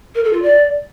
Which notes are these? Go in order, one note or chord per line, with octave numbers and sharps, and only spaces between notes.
A#4
A4
F4
D5